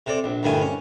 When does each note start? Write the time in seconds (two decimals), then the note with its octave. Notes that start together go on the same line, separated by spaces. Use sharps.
0.06 C3 A4 D5
0.24 A#1
0.43 D2 G2 D#3 E4 G#5
0.62 C#4